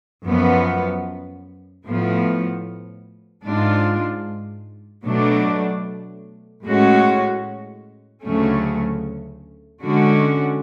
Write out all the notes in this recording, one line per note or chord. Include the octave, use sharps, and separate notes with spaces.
F#2 F3 B3
A2 F3 B3
G#2 G#3 D4 F4
B2 F#3 A3 D4
A2 G#3 C#4 F#4
D2 C#3 F#3 A3 C#4
D3 G#3 C#4 F#4